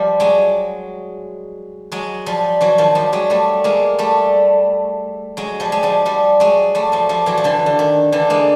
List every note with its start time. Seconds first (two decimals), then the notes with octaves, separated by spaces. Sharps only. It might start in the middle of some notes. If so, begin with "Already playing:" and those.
Already playing: F3 G3
0.20 F#3 G#3
1.92 F#3 G#3
2.26 F3 G3
2.61 E3 F#3
2.78 D#3 F3
2.95 F3 G3
3.13 F#3 G#3
3.30 G3 A3
3.64 G#3 A#3
3.99 G3 A3
5.37 F#3 G#3
5.60 F3 G3
5.72 G#3
5.83 F3 G3
6.06 F3 G3
6.40 F#3 G#3
6.75 G3 A3
6.92 F3 G3
7.09 F3 G3
7.26 E3 F#3
7.37 F3
7.44 D3 E3
7.66 D3
7.79 D#3
8.12 D3 E3
8.30 G#3 A#3